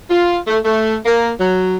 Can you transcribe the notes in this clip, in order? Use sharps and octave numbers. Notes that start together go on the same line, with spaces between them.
F4
A3
A3
A#3
F#3